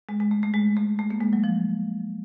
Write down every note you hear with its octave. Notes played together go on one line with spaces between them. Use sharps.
G#3
G#3
A3
A3
G#3
A3
A3
A#3
G#3
F#3
F3